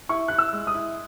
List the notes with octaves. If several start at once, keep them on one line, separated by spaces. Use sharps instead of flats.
E4 C#6
E4 F#6
E6
G#3
D#6
E4